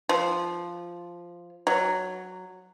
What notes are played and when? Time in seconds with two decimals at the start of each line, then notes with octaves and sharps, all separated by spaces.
0.09 F3
1.67 F#3